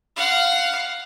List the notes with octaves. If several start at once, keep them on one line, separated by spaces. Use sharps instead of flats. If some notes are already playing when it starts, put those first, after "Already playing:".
F5 F#5